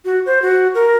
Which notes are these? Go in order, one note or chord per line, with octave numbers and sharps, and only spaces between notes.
F#4
C5
F#4
A#4